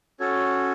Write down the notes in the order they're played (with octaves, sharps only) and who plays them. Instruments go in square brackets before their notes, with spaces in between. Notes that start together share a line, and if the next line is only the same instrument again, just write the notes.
[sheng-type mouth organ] C#4 F#4 A4 C#5